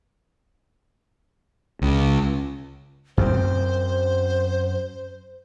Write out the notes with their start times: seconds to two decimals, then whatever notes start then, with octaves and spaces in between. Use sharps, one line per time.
1.82 C#2
3.17 F#2 C4 C5